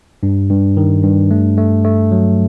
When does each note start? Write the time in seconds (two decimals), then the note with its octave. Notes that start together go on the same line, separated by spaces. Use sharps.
0.23 G2
0.50 G2
0.77 D#3
1.03 G2
1.31 A3
1.57 A3
1.84 A3
2.12 F#3